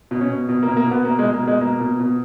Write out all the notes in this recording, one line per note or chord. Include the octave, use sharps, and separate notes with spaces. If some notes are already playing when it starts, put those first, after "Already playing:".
B2
C#4
B2
B2
A#3
B2
A#3
B2 B3
B2 A#3
G#3
B2
A#3
B2
G#3
B2 A#3
B2
B2